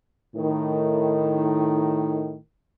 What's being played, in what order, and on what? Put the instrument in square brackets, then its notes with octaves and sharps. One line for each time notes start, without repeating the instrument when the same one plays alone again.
[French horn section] A2 D#3